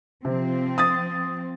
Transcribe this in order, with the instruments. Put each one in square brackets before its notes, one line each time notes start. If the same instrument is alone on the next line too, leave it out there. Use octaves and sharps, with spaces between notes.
[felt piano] C3 [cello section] F3 C4
[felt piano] D#6 A6